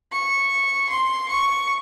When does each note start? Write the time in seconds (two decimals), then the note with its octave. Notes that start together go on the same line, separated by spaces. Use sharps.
0.12 C#6
0.90 C6
1.29 C#6